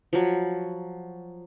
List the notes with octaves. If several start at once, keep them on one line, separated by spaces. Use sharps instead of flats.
F3 F#3